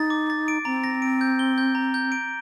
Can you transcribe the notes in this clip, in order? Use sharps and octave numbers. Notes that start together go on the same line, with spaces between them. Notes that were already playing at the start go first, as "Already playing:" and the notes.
Already playing: D#4 A6
D6
A6
D7
C4 A#5
A#6
D7
G6
G7
G6
A#5
G6
D7